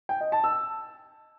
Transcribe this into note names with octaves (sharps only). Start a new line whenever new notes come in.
G5
D#5
A5
E6